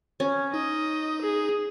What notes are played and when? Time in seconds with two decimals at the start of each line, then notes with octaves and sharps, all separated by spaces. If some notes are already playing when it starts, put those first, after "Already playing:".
0.20 C#4
0.54 D#4 D#5
1.22 G#4